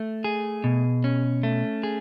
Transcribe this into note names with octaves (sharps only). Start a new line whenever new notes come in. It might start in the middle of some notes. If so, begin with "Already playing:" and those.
Already playing: A3
G#4
B2
C#4
A3
G#4